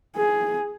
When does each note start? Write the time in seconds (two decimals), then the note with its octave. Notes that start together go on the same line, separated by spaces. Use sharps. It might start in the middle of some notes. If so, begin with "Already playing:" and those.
0.16 G#4